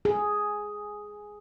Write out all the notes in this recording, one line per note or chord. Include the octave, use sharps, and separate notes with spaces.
G#4